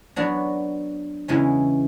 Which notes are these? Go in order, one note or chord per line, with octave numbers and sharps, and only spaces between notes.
F#3 B3 D4 F#4
E2 C#3 E3 G#3 C#4